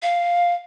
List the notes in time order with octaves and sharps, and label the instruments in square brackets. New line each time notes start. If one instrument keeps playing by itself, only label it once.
[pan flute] F5